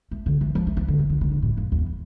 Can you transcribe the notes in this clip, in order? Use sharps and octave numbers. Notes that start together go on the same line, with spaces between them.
A3
D3
E3
F3
A3
F3
D3
E3
D3
D3
D3
A2
F2
E2